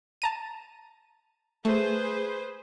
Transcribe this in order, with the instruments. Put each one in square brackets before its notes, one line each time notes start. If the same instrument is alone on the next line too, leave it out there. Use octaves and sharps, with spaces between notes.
[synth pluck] A5 A#5 D#7
[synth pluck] A3 [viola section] G#4 B4 C5